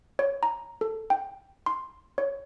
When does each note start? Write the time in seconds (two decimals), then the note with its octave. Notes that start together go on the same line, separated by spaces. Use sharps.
0.19 C#5
0.43 A#5
0.81 A4
1.10 G5
1.66 C6
2.18 C#5